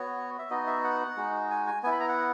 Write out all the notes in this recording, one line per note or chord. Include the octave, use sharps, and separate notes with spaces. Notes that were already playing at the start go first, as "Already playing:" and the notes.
Already playing: B3 F#4 C#5
E5
B3 D#4 F#4 D#5
E5
F#5
G#3 D#4 F#4
G#5
G#5
B3 E4 G#5
B5
A#5
F#5